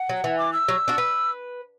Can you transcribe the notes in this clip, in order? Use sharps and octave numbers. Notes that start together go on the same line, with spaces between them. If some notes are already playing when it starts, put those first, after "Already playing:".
Already playing: F#5
F#3
E3
D6
E6
F#3
D4 F#4
B4